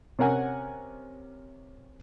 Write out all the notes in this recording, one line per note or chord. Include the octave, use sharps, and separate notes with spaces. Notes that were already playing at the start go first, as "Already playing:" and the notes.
C3 C#4 A#4 F#5 G#5